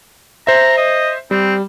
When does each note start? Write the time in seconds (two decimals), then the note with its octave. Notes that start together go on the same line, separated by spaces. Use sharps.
0.47 C5 E5 A#5
0.77 D#5
1.31 G3 C4